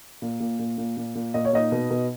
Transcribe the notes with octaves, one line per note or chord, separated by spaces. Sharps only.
A#2
A#2
A#2
A#2
A#2
A#2
A#2 D#5
C#5
A#2 D#4 D#5
B2
B2